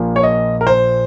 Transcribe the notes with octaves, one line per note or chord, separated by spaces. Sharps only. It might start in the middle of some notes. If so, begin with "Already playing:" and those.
Already playing: A#1 A#2 F3 A#3
C#5
D#5
A#4
C5